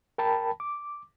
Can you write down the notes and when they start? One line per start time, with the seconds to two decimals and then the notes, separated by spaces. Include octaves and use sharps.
0.18 A#4 G5 A5 B5
0.60 D6